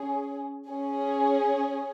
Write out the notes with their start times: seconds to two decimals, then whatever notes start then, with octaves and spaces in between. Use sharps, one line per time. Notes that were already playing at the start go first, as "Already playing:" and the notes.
Already playing: C#4 G#4
0.69 C#4 G#4